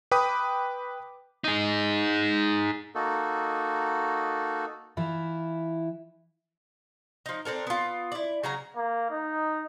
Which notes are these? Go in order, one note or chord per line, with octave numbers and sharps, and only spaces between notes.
B4 G5 B5 D6 D#6
D#4 G#4
A#3 D#4 F#4 A4
E3 E4 F4
F3 D#4
C4 D4 A4 A#4
B3 F4
E4 D5
C#3 F#3 G#5 A#5
A#3
D#4